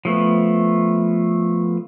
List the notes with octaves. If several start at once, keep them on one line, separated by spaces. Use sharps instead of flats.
F3 A3 B3